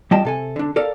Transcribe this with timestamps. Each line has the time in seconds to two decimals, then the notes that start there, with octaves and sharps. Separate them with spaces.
0.11 G3 F4 D#5 G5 A5
0.25 C3 A4 G#5
0.56 D3 D4
0.76 A4 A#4 D5 F5